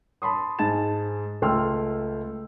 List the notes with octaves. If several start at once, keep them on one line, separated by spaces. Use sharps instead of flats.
A5 B5 C6 D#6
G#2 G#4 A5 A6 E7
C#2 A3 G5 C6 E6 F6